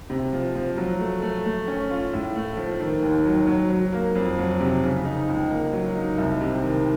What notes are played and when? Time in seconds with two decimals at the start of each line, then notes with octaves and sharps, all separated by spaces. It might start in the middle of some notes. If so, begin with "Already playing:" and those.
0.10 C3
0.33 F3
0.55 F3
0.77 F#3
1.00 A3
1.22 A3
1.45 A3
1.67 C#4
1.90 F4
2.13 A2
2.35 A3
2.57 F3
2.80 D#3
3.02 D#2
3.25 F#3
3.47 F#3
3.70 F#3
3.92 A#3
4.15 F2
4.38 F#3
4.60 C3
4.83 C#3
5.05 D#4
5.28 C#2
5.51 A#3
5.73 F#3
5.95 D#4
6.17 C2
6.41 C3
6.63 D#3